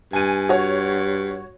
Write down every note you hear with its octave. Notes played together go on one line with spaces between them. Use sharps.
G2 G#5 D#7
F#4 C#5